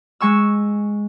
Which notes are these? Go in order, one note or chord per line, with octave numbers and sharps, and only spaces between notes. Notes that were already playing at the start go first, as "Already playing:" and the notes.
G#3 G#5 C#6 E6